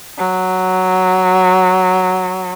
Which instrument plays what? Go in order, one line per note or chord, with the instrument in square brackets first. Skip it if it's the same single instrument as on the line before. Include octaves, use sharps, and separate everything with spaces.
[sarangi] F#3